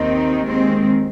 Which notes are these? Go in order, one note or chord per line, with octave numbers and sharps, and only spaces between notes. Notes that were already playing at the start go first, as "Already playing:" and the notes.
Already playing: D#2 D#3 C4 D#4
G#3 C4